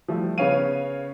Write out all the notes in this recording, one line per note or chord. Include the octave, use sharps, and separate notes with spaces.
F3 G3 A3
C#3 B3 C#4 C#5 F5 D#7